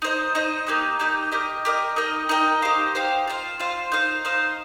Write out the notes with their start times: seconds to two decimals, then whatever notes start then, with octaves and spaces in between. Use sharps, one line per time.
0.02 D#4 C5 D#5
0.35 D#4 C5 D#5
0.67 A#3 D#4 G4 D#5
0.99 A#3 D#4 G4 D#5
1.32 G4 A#4 D#5
1.65 G4 A#4 D#5
1.96 D#4 A#4 D#5 G5
2.29 D#4 A#4 D#5 G5
2.62 D#4 G4 C5 F5
2.95 D#4 G4 C5 F5
3.27 F4 C5 F5
3.60 F4 C5 F5
3.92 D#4 C5 F5
4.25 D#4 C5 F5